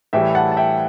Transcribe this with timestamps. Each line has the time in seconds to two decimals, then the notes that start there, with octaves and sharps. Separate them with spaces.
0.13 A2 E3 G3 E5 G5
0.35 F#5 A5
0.52 A5
0.57 E5 G5